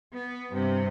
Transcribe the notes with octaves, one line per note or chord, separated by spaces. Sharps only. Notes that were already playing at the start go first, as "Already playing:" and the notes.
B3
G2 C3